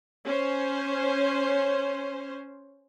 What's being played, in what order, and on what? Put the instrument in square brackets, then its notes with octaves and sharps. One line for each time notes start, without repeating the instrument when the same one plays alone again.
[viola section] C#4 C5